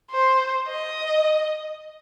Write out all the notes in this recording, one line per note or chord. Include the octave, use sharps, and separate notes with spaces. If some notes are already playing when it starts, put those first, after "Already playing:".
C5
D#5